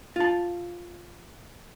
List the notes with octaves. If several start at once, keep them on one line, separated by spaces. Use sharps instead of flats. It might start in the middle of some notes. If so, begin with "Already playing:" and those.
F4 A5